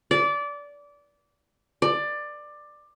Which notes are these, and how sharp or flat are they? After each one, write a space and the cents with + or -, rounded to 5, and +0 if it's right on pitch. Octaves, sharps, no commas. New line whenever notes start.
D5 -20
D5 +15